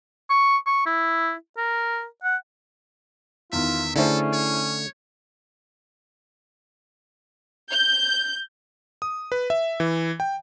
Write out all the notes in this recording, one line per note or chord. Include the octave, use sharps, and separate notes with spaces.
C#6
C#6
E4
A#4
F#5
E2 D#3 F4 E5
D3 A3 C#4 E4 G#4 A4 C5
C#5
G6
D#6
B4
E5
E3
G5